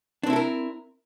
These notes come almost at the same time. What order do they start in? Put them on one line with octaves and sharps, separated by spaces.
D4 C4 E4 A4 A#4